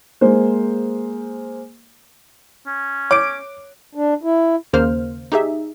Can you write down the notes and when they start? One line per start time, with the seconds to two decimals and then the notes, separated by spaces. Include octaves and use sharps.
0.21 G#3 A#3 C5
2.66 C#4
3.11 C#5 D6 D7
3.95 D4
4.23 E4
4.73 D#2 C#3 A#3 C5 F6
5.32 D#4 G4 G#4 E5